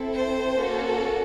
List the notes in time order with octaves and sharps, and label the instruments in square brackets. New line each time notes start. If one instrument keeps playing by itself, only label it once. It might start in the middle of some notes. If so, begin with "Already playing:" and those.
Already playing: [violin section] C4 E4 A4
C5
A#3 C#4 F#4 A4